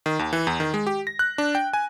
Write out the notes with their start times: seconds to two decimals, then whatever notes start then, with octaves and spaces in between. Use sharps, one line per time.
0.06 D#3
0.19 D#2
0.33 E3
0.47 E2
0.60 D#3
0.74 G#3
0.87 G4
1.07 A#6
1.19 F#6
1.38 D4
1.55 G5
1.73 G#5